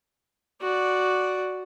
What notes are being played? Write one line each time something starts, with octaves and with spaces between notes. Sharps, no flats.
F#4 D5